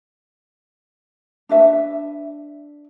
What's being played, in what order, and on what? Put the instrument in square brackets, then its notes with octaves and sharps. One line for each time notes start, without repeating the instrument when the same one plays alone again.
[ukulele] D4 B4 E5